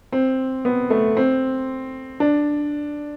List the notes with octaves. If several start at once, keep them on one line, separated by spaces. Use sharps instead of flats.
C4
B3
A3
C4
D4